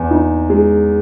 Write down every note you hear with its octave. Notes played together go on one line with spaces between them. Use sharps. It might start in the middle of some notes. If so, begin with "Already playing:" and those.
Already playing: E2
D#4
G#3